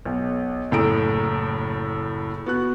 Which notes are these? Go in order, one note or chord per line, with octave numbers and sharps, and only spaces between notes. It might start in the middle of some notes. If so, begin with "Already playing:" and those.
B1
F#1 A2 A4 A#5 D#6 D7
B3 F#4 F#6